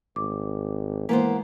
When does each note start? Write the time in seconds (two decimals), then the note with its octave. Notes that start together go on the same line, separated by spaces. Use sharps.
0.16 G#1 D6
1.09 E3 G#3 A#3 B3 B4 C5